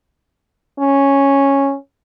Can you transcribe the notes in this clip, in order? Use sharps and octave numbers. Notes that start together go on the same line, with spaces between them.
C#4